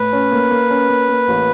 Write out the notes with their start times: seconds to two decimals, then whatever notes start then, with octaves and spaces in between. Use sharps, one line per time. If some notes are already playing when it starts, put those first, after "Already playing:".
Already playing: A2 B4
0.13 C#4
0.32 A#3
0.51 A#3
0.70 C#4
0.89 A#3
1.09 A#3
1.28 A1